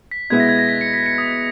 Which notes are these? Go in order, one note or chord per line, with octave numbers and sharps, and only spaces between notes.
B6
B2 G#3 B3 E4 G#6
A#6
G#6
A#6
B6
C#7
B6
C#7
D#6